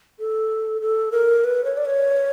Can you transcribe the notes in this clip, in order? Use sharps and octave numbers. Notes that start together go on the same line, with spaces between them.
A4
A4
A#4
B4
C#5
D5
C#5